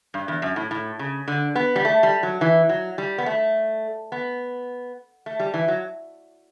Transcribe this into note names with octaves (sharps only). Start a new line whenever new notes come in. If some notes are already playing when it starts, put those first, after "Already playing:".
G2
E2
F#2
A2
A2
C#3
D3
B3
G3
A3
G3
F#3
E3
F#3
G3
B3
A3
B3
A3
G3
E3
F#3